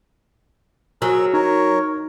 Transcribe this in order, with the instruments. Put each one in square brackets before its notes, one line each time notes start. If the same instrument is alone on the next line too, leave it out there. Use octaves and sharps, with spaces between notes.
[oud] F#3 [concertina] G#4 A#4 E6
[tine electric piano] D#4 [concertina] A#4 C#5